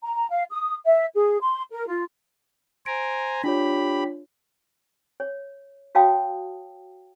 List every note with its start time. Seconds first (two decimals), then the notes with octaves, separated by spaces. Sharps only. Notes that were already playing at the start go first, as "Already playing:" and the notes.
0.03 A#5
0.30 F5
0.51 D#6
0.85 E5
1.14 G#4
1.41 C6
1.71 A#4
1.87 F4
2.86 C5 G#5 A#5 D7
3.44 D4 F4 G4 C#5 B5
5.20 C#5
5.95 F#4 C#5 F5 G5 A5 D#6